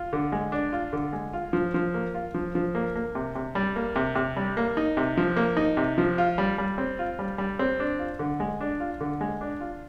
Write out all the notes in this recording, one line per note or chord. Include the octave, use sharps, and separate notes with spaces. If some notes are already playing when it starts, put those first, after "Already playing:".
Already playing: F4
D3
G#3
D4
F4
D3
G#3
F4
F3
F3
A#3
F4
F3
F3
A#3
A#3
C3
C3
G3
A#3
C3
C3
G3
A#3
D#4
C3
F3
A#3
D#4
C3
F3
F4
G3
G3
C4
F4
G3
G3
C4
D4
F4
D3
G#3
D4
F4
D3
G#3
D4
F4